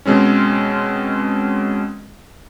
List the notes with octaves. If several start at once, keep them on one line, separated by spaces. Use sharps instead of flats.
B2 G#3 C4 C#4